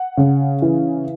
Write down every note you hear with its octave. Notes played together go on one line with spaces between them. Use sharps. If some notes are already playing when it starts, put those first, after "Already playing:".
Already playing: F#5
C#3
E3